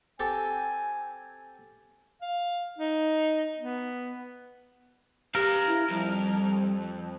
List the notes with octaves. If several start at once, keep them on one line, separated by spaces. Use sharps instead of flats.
C4 G4 A4 G#5
F5
D#4
B3
G4 A#4 B4 F5
E4
F2 G3